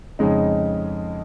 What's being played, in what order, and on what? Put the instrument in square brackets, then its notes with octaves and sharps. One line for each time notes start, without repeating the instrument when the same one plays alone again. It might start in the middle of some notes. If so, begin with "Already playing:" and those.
[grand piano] F2 C#3 G#3 D#4